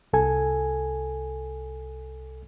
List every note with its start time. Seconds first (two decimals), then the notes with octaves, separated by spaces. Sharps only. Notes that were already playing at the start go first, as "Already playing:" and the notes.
0.13 C2 A4 G#5